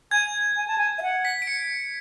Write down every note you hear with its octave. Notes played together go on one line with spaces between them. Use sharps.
G#5 G#6
G#5
A5
G#5
E5
F#5
B6
D7
C#7